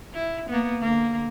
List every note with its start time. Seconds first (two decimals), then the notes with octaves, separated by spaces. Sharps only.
0.14 E4
0.49 A#3 B3
0.80 D3 A#3